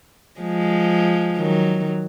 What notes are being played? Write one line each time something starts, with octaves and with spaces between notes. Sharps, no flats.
F3 G#3
D#3 F#3